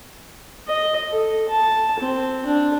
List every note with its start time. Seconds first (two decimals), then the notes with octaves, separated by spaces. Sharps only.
0.68 D#5
1.09 A4
1.49 A5
1.99 C4
2.45 D4